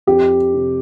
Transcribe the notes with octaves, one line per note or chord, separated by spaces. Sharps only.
F2 G4
C3